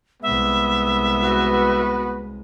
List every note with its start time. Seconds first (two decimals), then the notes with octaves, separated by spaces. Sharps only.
0.22 C2 G#3 B3 E5
1.22 F#4 B4